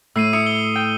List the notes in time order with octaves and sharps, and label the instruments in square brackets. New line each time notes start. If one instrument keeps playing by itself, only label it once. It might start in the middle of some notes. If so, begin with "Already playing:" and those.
[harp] A2 [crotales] E6 C7 D#7
[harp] E4 [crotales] D#6 C#7
[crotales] G7
[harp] G5